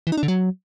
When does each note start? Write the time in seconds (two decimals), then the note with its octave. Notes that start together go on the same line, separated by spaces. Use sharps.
0.07 E3
0.12 D#4
0.18 D4
0.23 D3
0.28 F#3